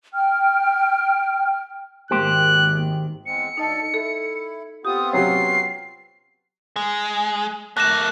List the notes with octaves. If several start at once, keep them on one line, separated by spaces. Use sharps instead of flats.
G5 F6
G#1 D#3 G#3 A#3 G4 C5 F#6
E2 G#3 C4 C#7
D2 D#4 A4 D#5 A5
E4 A4
B3 C4 F4 G4 D#6
C3 F#3 C#4 C7
G#3
A3 A#3 F#6 A#6 E7